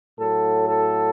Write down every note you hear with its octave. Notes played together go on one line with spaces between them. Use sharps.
A2 F#3 A4
A4